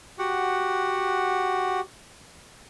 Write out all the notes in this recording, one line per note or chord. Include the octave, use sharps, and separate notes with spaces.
F#4 G4 F#5